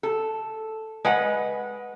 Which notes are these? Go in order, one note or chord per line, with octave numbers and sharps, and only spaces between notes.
A4
G#3 B4 F#5